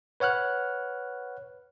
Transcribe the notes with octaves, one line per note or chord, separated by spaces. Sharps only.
B4 C#5 F#5 F6 F#6